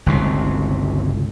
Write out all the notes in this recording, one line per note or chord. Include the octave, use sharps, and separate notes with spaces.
G1 C#2 C3